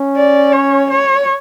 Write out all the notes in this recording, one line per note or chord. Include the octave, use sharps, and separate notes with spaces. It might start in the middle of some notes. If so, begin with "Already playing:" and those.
Already playing: C#4
D5
C#5
C#5